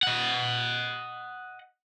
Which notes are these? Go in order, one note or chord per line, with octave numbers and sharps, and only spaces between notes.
D#5 F#5